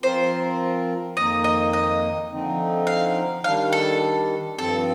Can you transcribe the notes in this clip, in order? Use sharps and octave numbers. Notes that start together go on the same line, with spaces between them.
F3 C4 F4 A#4 C5
F2 D#3 A#3 D#4 D#5
D#5
D#5
D3 F3 C4 D#4
F5
D#3 G3 D4 F5
A4
G2 F3 C4 A4